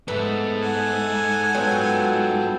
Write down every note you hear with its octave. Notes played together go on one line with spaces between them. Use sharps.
F2 G#2 A3 B3 A4
F#5 G#5
F#3 B3 F4 A4 G5